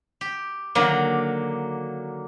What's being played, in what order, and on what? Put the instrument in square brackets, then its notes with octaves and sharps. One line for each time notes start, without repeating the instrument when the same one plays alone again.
[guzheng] G4
[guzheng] D3 D#3 F#3 [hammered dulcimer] A#3